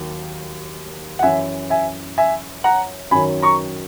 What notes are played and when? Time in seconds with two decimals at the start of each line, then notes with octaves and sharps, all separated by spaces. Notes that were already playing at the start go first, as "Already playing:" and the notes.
Already playing: D#2 D#3 F#3
1.19 F#5
1.23 F#2 E3 E5 G#5
1.70 E5 G#5
2.18 E5 G#5
2.64 F#5 A#5
3.11 F#2 D#3 F#3 G#5 B5
3.42 A#5 C#6